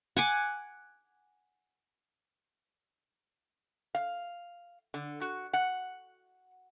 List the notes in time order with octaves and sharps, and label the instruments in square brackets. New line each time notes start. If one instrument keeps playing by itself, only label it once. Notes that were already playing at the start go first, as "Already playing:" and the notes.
[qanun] F#5 G#5 D6
[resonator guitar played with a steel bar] F5
D3
F#4
F#5